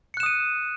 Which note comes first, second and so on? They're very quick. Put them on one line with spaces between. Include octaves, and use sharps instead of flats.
C#7 F#6 E7 D#6 D#7